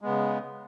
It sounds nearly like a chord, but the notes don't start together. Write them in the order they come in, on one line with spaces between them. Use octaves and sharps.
G#3 B3 C#3